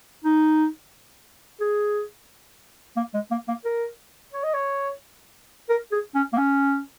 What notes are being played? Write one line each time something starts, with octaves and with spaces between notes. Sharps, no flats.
D#4
G#4
A#3
G#3
A#3
A#3
A#4
C#5
D#5
C#5
A#4
G#4
C#4
A#3
C#4